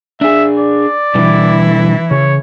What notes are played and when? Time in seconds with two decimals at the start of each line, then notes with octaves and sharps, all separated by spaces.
0.21 D4 G#4 E5
0.59 D5
1.15 B2 D3 E3 G3 E4
2.11 C#3 C#5